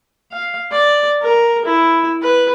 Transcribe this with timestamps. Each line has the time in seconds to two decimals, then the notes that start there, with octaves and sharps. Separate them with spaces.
0.32 F5
0.72 D5
1.22 A#4
1.65 E4
2.22 B4